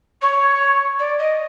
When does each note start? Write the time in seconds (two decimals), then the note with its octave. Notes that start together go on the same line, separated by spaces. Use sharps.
0.21 C#5
0.99 D5
1.18 D#5